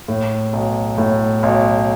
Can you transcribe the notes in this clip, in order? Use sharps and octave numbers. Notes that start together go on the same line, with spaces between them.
A2
B1
A2
B1